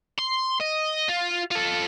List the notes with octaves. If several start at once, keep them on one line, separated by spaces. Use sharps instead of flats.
C6
D#5
F4
F4 A4